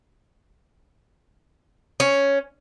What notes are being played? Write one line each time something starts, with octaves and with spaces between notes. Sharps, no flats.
C#4